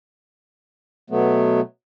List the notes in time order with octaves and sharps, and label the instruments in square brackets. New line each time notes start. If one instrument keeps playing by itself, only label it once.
[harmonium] B2 F#3 A3 B3